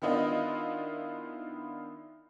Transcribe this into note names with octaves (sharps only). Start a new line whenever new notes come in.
D#3 B3 D4 E4 F4 D#5